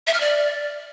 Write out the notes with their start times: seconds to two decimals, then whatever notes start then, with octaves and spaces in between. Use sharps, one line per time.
0.07 E5
0.14 F6
0.20 D5